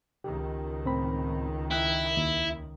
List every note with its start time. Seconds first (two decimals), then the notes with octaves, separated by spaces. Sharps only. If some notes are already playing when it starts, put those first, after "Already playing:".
0.24 C#2 D#3 G4
0.85 A2 C4 B5
1.71 E4 G5 F#6
2.17 D#2